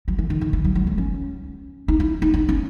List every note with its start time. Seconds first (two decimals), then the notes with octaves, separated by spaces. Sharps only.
0.08 F#3
0.18 E3
0.30 D#3
0.41 D#3
0.53 E3
0.64 F#3
0.75 F#3
0.87 A3
0.98 C#4
1.88 D#4
2.00 E4
2.22 D#4
2.34 D#4
2.49 C#4